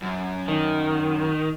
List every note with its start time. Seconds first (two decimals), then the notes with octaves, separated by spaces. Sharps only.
0.02 F#2
0.48 D#3